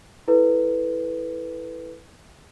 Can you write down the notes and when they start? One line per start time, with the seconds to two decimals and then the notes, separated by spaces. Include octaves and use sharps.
0.28 E4 A4 B4